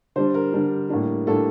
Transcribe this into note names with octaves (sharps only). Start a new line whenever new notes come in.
D3 G3 D4 C5
A#4
D3 G3 D4
A2 G3 A#3 D4
A2 G3 A#3 D4 A4